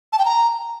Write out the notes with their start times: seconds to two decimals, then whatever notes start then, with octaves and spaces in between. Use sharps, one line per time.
0.13 A5
0.19 G5
0.25 A#5